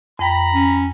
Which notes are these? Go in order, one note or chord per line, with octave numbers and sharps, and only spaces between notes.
F2 G5 A#5 B5
C#4